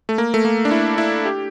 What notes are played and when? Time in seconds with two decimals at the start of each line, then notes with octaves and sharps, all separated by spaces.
0.09 A3
0.18 A#3
0.34 A3
0.45 A#3
0.65 D4
0.71 E4
0.98 E4
1.26 G4